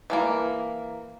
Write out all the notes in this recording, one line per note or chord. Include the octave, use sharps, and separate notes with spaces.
E3 G3 A#3